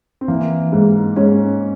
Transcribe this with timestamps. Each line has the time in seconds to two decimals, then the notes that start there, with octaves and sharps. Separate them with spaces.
0.21 C4
0.28 E3 A#3
0.72 G#2
1.16 G#2 C#4